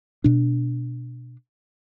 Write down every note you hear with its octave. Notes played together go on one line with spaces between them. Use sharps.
B2 D4